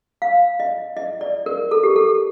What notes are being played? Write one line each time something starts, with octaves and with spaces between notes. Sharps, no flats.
F5
D#5
D#5
D5
A#4
A4
G4
A4